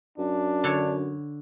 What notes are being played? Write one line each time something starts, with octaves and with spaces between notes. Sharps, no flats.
F#2 D4
D3 C#5